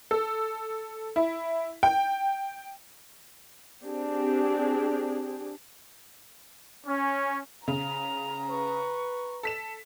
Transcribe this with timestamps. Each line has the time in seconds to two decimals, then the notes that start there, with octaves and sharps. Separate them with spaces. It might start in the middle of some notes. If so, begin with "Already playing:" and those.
0.11 A4
1.16 E4
1.83 G5
3.83 C4 D4 G4 G#4
6.87 C#4
7.68 C#3 A#5 F7
8.50 B4 C#6
9.43 A4 B6 E7